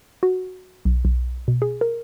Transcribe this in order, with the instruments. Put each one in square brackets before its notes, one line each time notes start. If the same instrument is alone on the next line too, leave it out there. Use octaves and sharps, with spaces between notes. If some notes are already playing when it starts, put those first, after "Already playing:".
[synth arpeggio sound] F#4
B1
B1
B2
G#4
A#4